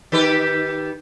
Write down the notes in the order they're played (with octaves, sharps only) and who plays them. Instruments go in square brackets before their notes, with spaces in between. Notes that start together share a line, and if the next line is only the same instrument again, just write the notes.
[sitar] D#3 G4 B4